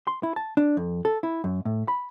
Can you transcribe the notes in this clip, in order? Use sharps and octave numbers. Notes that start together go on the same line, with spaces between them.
C6
E4
A5
D4
F2
A4
E4
F#2
A2
B5